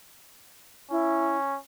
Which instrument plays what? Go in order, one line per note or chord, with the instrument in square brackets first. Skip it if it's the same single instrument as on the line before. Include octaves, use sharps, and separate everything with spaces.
[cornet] C#4 [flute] E4